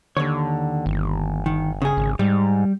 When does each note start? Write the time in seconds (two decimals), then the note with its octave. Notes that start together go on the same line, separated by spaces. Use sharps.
0.17 D#2 D3 C#5
0.86 G1
1.46 D#3
1.82 C#3 G#4
1.97 G#1
2.19 G#2 G3